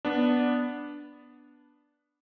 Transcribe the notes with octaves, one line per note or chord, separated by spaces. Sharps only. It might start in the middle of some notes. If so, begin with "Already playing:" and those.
B3 D4